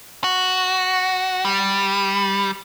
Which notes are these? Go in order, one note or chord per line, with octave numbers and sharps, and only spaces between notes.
F#4
G3